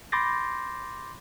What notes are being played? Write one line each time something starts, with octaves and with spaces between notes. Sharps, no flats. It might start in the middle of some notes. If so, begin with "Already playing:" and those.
B5 C6 D6 G6 A6 A#6